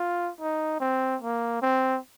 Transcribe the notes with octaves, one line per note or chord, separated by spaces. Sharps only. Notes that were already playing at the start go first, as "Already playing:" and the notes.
Already playing: F4
D#4
C4
A#3
C4